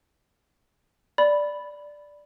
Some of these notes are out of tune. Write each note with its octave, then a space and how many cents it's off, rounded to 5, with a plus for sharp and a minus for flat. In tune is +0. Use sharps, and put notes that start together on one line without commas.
D5 +0 B5 +0